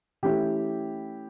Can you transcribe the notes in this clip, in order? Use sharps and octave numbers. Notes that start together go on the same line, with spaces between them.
E3 A3 C#4 E4 G4